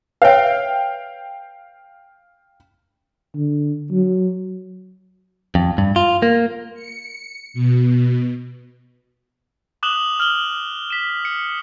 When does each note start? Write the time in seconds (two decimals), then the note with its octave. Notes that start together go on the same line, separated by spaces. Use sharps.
0.22 B4 C#5 E5 F5 G5
3.35 D3
3.92 F#3
5.55 F2
5.78 G2
5.96 F4
6.22 A#3
6.74 C#7
7.54 B2
9.83 D6 D#6 F#6 E7 F#7 G7
10.20 F6 F#7 G7
10.90 B6 E7
11.25 C#7